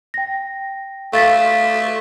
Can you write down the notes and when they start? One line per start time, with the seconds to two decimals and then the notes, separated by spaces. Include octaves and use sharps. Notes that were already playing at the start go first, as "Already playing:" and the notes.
0.14 G5 A#6
1.13 A3 F5 A6 B6